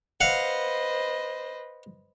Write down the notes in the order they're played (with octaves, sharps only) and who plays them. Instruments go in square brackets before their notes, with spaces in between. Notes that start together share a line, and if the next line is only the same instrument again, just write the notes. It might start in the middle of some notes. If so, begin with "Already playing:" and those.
[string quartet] B4 C5 D#5 [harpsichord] F5 F#5